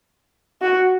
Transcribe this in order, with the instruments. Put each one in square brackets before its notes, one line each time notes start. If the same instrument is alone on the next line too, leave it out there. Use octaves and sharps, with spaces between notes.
[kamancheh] F#4